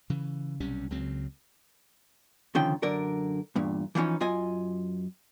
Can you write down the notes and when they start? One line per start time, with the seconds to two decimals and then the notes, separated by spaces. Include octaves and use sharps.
0.10 C#3 E3
0.60 B1 C3 G3 C#4
0.90 C#2 C#3 F#3 C4
2.55 C#2 D3 D#3 F3 C#4 G5
2.83 F#2 D3 A#4 D5
3.56 E2 G2 A#2
3.95 E3 F3 G3 C#4 D#4
4.20 F#2 F4 D#5 G#5